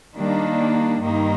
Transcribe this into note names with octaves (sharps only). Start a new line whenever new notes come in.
D#3 G3 A#3 D4
G2 D#3 A#3 D#4